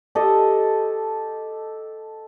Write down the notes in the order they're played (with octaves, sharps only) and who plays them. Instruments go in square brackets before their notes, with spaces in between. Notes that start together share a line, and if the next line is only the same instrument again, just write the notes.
[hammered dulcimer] G4 A4 C5 D#5